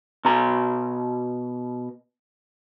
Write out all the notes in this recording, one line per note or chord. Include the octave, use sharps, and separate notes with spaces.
B2 A#5